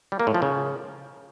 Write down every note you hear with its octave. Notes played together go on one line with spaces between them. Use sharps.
G3
A#3
A2
F3
C#3